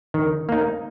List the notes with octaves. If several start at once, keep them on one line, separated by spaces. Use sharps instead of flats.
D#3
A#3 D#4